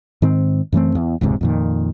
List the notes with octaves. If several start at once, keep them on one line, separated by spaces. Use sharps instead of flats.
G#2 D#3 C4
F#2 E3 A3 C4
E2
E1 C#2 G#2 C3
F2 A#2 D#3